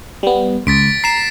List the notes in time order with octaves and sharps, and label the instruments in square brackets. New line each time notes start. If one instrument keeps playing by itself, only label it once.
[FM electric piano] G3 B3
[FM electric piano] C#2 [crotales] A6 B6 D7
[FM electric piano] A#5 [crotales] C7 E7